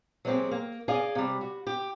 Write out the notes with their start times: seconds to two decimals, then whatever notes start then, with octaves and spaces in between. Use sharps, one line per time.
0.25 F#3 G#3 A#3 C4 G4 G#4
0.51 A#3
0.88 G#4 D5 D#5 F5 G#5
1.15 C3 G3
1.41 F#4
1.67 G4